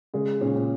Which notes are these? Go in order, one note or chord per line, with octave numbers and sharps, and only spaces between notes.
C#3 G#3
A#2 C#4
A#2